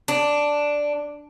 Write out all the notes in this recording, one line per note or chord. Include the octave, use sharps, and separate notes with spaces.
D4